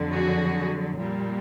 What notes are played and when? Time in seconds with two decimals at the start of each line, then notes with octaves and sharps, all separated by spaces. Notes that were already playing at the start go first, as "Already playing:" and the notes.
Already playing: F2 D3 F#3
0.12 F#4 G#4
0.95 A#2 G3